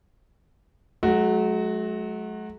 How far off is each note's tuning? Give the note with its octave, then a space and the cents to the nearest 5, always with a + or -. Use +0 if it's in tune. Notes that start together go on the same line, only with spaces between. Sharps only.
F#3 +0 A3 -45 F#4 +0